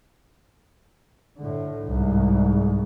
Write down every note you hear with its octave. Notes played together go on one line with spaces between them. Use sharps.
A2 D3
C2 G#2